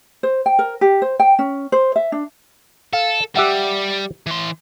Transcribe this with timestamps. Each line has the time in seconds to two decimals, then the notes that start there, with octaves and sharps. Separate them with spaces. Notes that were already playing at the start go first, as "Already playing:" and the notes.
0.23 C5
0.46 G5
0.59 A#4
0.81 G4
1.02 C5
1.20 G5
1.39 C#4
1.72 C5
1.96 E5
2.12 D4
2.93 A4 F5
3.36 G3 G4 E5 F#5
4.26 E3 C6